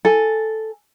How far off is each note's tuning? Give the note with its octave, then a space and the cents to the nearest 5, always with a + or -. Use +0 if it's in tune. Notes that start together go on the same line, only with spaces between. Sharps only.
A4 +0 G#5 +0